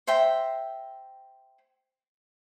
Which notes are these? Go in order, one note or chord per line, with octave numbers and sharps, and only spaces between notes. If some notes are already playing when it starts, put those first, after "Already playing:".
C5 E5 G5 A#5